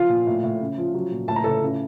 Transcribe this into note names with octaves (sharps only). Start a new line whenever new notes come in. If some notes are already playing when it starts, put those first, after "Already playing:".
Already playing: F3 F4 F5
A#2
A2
A2
C#3
F3
F#3
A#2
A2 A5
A#5
A2 A4 A5
C#3